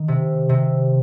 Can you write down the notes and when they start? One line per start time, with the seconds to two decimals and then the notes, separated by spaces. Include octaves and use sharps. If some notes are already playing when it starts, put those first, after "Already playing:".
Already playing: D#3
0.08 C3
0.49 C3